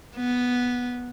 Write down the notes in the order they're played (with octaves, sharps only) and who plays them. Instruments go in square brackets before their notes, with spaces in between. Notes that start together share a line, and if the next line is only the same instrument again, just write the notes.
[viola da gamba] B3